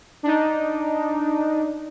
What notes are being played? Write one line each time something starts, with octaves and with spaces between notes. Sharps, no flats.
D4 D#4